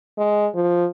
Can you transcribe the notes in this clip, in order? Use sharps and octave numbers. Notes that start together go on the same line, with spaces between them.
G#3
F3